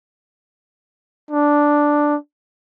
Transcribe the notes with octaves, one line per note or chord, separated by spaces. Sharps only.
D4